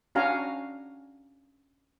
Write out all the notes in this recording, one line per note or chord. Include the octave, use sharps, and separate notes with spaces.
C#4 D4 F#4 F5 G#5 A#5